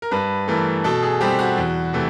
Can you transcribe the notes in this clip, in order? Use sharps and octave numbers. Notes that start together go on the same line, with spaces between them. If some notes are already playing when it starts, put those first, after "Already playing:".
A#4
G2 B4
E3 A3 A#4
B2 A4
G#4
G3 C4 G4
F#4
E2
C3 E3 A3